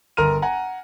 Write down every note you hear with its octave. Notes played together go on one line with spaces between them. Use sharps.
G1 A#4 A#5 C6 F6 D#7
F#5 G#5 A#5